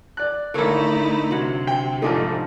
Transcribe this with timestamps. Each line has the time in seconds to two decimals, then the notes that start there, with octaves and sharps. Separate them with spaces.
0.17 D5 F#6
0.54 G#1 D3 A3 A#3 D#4 E4 A4 C#5
1.31 C3 F#3 F#5
1.67 G5
2.02 A1 G#2 F3 A3 D4 D#4